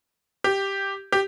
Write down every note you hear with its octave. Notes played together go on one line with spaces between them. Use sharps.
G4
G4